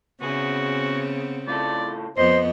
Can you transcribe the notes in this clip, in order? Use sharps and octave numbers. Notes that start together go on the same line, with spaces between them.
C#3 B3 C4 F#4 G#4
A2 F4 A4 D5
F2 B3 C5 D#5 C6